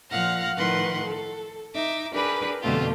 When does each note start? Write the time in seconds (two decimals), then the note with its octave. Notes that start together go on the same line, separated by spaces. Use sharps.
0.11 A#2 F3 F5 F#5 F6 A#6
0.55 A2 D#3 F3 B4 F#5 C6
1.03 A4
1.74 D#4 E5 D6
2.13 D4 G4 G#4 A#4 B4 B5
2.61 F2 B2 D3 A3 F4 G4